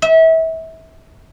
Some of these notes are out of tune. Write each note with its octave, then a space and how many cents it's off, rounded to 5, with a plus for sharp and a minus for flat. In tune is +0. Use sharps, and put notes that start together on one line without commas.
E5 -30